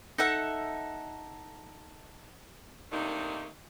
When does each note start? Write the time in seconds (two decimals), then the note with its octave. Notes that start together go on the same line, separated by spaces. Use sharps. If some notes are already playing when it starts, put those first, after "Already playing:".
0.18 D#4 A4 E5 F#5
2.91 C3 D#3 A3 A#3 D4 D#4